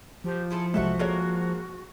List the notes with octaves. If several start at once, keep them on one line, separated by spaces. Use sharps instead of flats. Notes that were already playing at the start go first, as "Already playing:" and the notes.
F3 G4
E4 G#4 A4 C6
B1 C3 G#3 F#4 A4 E5 F#5
G#3 A#3 A4 C#5